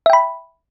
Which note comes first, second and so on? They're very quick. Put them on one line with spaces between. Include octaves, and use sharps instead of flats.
E5 G5 B5